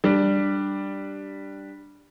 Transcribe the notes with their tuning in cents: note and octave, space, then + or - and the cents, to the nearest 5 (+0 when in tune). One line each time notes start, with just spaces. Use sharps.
G3 +0 D4 +0